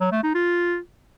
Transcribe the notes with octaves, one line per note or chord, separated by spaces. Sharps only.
F#3
A3
D#4
F4